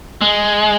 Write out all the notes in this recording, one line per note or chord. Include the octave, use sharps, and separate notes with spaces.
G#3